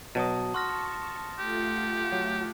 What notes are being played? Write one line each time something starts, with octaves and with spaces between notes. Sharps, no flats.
B2 F#3 A5 D#6
F#4 A5 C6 C#6 F6 A#6
A3 F4 G4 F#5
F#3